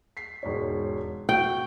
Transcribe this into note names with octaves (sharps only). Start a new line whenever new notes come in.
B6 C7
E1 G#2 C#5
F#4 G5